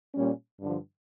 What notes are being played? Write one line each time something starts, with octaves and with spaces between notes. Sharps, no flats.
A#2 G3 C#4
G2 D3 F3